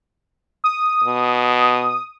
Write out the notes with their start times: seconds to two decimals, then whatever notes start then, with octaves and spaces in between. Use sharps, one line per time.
0.64 D#6
1.04 B2